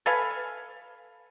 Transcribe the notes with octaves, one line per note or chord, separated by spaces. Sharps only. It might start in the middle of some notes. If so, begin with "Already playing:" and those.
A4 B4 F5 G#5